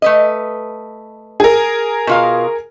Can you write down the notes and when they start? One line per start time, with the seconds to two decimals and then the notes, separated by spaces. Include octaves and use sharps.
0.02 A3 B4 D#5
1.40 G#4 A#4
2.07 B2 F4 F5